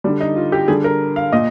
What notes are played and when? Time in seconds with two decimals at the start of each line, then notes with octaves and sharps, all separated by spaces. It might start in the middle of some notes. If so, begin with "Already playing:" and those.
0.04 D3 G3 D4
0.21 D#4
0.36 F4
0.52 G4
0.68 D3 G3 G#4
0.84 A#4
1.16 F5
1.32 A#2 D#5